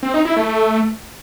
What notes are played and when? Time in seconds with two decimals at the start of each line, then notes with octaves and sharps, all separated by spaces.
0.03 C4
0.14 D#4
0.25 E4
0.37 A3